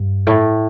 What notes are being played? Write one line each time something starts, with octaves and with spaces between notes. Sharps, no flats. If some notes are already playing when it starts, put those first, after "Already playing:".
Already playing: G2
A2